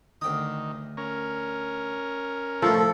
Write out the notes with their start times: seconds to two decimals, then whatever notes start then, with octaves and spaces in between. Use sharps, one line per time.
0.21 D2 D#3 G5 D#6
0.97 C#4 A#4
2.62 C2 A2 F3 E4 A4